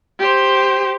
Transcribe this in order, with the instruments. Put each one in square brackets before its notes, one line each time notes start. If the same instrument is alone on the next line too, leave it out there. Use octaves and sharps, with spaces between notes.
[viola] G4 C5